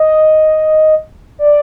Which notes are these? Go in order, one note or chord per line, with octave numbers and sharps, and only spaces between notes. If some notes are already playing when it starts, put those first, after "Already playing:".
Already playing: D#5
D5